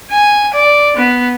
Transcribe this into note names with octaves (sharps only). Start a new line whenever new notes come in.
G#5
D5
B3